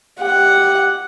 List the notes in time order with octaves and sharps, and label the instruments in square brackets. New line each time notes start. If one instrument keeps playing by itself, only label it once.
[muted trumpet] G4 [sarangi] F#5